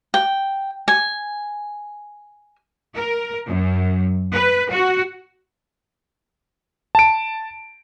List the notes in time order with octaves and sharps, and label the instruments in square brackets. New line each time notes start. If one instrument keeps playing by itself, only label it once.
[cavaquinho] G5
G#5
[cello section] A#4
F#2
B4
F#4
[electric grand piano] A5 D7